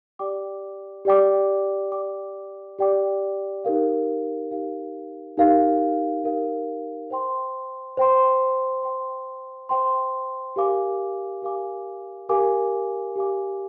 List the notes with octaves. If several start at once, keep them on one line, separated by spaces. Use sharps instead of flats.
G4 D5 G5 D6
G4 D5 G5 D6
G4 D5 G5 D6
G4 D5 G5 D6
D#4 G4 A#4 F5
D#4 G4 A#4 F5
D#4 G4 A#4 F5
D#4 G4 A#4 F5
C5 G5 C6
C5 G5 C6
C5 G5 C6
C5 G5 C6
G4 A#4 F5 G#5 D6
G4 A#4 F5 G#5 D6
G4 A#4 F5 G#5 D6
G4 A#4 F5 G#5 D6